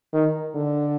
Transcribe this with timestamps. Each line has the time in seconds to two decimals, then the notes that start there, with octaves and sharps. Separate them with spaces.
0.13 D#3
0.55 D3